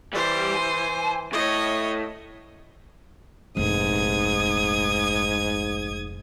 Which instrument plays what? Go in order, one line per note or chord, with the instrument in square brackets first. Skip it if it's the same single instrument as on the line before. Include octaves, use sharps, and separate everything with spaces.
[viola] E3 C5 [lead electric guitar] G3 D5
[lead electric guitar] G#5
[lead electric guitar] A2 [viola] C#5 D#5
[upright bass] F1 A#1 [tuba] G#2 [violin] D#6 G#6